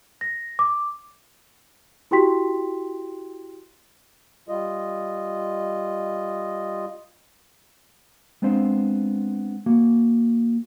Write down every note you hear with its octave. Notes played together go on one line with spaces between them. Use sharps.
A#6
D6
E4 F#4 G4 G5 C6 B6
G3 F4 D#5
G#3 B3 C4 D4 C5 F5
A#3 F#4